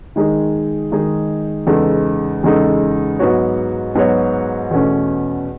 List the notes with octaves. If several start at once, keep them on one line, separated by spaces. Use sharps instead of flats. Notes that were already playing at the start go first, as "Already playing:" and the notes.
D#3 G#3 D#4 G#4
D#3 G#3 D#4 G#4
E2 C#3 G#3 D#4 A4
E2 C#3 G#3 D#4 A4
G#2 F#3 B3 F#4 C#5
G#2 F#3 B3 F#4 C#5
E2 B2 A3 C#4